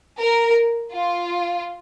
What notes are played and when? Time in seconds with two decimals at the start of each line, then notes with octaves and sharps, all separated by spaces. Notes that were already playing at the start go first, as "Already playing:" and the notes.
0.18 A#4
0.94 F4